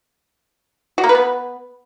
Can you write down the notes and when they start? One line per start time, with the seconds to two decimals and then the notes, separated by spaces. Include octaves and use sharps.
0.98 F#4
1.04 A#3
1.09 B4
1.15 B3